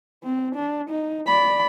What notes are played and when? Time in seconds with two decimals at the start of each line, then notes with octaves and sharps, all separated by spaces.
0.24 C4
0.55 D4
0.90 D#4
1.27 D5 B5